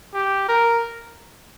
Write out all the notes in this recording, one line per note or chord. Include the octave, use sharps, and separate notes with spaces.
G4
A#4